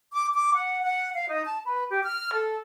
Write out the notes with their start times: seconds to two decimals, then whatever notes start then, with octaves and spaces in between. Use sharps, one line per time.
0.14 D6
0.33 D6
0.54 F#5
0.84 F#5
1.15 F5
1.30 D#4
1.45 A5
1.65 B4
1.90 G4
2.03 F6
2.34 A4